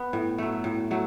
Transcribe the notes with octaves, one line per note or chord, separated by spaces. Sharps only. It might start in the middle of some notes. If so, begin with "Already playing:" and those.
Already playing: B3
A2
F#3 A3
A2
F#3 A3